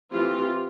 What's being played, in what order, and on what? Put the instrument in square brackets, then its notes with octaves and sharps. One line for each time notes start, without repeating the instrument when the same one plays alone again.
[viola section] E3 A3 C4 F4 G4